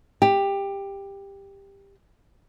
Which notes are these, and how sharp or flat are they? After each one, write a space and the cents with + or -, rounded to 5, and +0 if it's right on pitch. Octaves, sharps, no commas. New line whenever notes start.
G4 +15